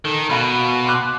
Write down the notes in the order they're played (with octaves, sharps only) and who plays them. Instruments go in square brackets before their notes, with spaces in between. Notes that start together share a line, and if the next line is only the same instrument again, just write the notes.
[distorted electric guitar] D#3 [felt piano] A4
[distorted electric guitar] B2 [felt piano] F5 B5
[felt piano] C6 D6 F#6